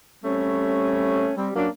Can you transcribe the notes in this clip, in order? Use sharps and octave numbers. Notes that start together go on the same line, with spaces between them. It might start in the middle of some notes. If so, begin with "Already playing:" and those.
G3 A3 C4 C#4
G3 C4
F#3 A#3 C#4 D4